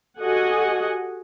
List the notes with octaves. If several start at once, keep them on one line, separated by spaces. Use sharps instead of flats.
F#4 G4 A4 D#5 F#5 G#5